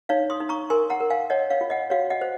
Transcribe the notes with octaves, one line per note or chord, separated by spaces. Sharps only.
D#4 C#5 F5
C6 D#6
D#4
A#5 C#6
A#4 G#5 C6
F#5 A#5
A#4
F5 G#5
C#5 D#5 F#5
C#5 F5
F4
D#5 F#5
F#4 C#5 F5
D#5 F#5
C5